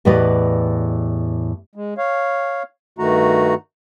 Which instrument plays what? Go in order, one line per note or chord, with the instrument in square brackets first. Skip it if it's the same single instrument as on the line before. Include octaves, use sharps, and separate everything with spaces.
[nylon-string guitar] E2 A2 G4 B4 D5 D#5
[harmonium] G#3
C#5 F5
G2 D#3 A3 F#4 A#5